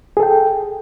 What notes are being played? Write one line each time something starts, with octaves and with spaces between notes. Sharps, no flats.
G#4 A4 G5